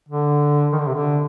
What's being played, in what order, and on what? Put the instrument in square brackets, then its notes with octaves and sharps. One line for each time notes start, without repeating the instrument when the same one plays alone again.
[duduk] D3
D#3
D3
C3
D3